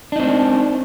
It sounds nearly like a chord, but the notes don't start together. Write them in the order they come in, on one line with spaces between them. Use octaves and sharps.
D4 D#4 C4